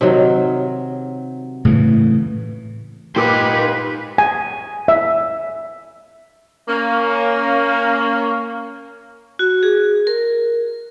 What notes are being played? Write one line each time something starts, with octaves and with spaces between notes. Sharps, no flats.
C3 D#3 F#3
A2 C#3 E3
A#2 D#4 G4 B4 C5 D6
G#5
E5
A#3 C#4
F#4
G#4
A#4